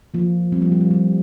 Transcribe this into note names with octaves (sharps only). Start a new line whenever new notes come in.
F3 A#3
G3 C4
F3 A#3
G3
F3
G3